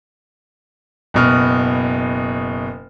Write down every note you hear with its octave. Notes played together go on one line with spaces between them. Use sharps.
F#1 B2 F6